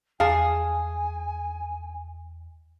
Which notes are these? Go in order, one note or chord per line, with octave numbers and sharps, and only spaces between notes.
E2 G#4 F5 G#5 A5